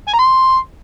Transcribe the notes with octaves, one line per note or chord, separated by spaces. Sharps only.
G#5
A#5
C6